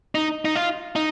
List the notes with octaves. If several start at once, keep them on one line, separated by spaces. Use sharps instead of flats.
D#4
D#4
F4
D#4